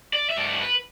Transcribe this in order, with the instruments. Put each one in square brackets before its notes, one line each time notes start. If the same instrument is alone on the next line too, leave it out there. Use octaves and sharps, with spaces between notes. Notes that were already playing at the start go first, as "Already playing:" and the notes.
[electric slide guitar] D5
E5
G#2 F#3 A3 D5
B4